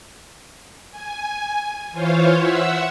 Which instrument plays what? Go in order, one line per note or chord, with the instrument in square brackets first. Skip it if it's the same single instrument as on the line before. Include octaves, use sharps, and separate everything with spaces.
[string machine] G#5
E3 F4 C5 C#5 F5
E5 F#5 E6